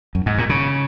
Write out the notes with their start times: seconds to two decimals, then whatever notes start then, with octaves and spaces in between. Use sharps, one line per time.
0.15 F#2
0.26 G#2
0.38 A#2
0.49 C#3